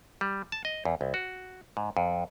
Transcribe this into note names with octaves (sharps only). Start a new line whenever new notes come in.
G3
A5
D#5
E2
C2
F#4
G#2
F2